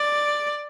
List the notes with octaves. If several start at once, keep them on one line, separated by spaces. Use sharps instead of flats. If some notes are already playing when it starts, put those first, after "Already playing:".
Already playing: D5